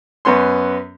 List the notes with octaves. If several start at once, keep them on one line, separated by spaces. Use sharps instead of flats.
F#2 B3 C#4 C6